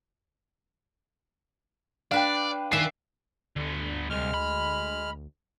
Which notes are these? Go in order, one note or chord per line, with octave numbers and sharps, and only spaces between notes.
D4 B4 D5 F5 G5
D#2 B4 D5 E5 G#5 C7
D2 D3 B3
C2 G#3 F6
B5